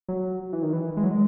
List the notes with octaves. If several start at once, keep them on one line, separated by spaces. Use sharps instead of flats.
F#3
E3
D#3
E3
G#3
F#3
G#3